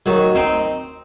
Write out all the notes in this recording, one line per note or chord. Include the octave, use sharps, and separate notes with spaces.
D#3 F#3
C4 D#4